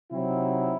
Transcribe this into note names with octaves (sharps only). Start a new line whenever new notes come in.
C3 F#3 C4 D#4 E4